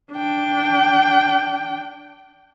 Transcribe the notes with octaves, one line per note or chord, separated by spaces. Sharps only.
D4 G5